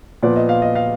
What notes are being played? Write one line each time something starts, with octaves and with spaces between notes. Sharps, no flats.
A#2 F3 B3 D5
D#5
F5
D#5
F5